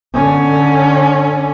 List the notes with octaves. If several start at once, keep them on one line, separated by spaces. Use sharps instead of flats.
D3 C#4